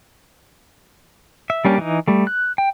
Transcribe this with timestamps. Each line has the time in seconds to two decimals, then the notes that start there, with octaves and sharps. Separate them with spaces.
1.50 E5
1.65 G3 A#3 C#4 D4 G4
1.78 E3 D#4
2.08 G3 A3
2.27 F#6
2.58 G5